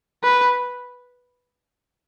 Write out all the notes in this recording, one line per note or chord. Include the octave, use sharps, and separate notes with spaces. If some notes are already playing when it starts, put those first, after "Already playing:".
B4